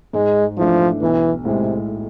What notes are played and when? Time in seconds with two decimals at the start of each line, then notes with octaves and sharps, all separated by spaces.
0.13 G#2 G#3
0.57 E3 F3 A3 D4
1.01 B1 E3
1.45 A2 C3 G#3